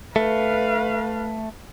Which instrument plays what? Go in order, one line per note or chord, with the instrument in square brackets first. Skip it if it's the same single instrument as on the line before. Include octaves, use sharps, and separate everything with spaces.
[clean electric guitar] A3 [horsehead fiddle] B4 F5